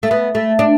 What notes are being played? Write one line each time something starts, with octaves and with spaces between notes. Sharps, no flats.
A3
B3
A3
D4